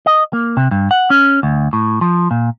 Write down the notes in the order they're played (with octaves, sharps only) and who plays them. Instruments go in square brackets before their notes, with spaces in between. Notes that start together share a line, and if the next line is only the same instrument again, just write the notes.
[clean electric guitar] D#5
A#3
C3
G2
F#5
C#4
D2
A2
F3
A#2